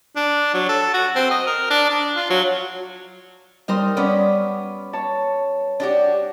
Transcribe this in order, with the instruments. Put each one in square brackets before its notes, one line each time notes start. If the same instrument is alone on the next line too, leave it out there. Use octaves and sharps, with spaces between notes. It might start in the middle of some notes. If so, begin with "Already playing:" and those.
[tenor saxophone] D4
F#3
A4
F#4
C4
D#5
A#4
D4
D4
F4
F#3
[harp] G3 [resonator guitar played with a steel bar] D#4 A#4 C5
[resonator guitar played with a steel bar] B3 C#4 D5
[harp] C#5 A5
[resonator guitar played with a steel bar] D4 F#4 G4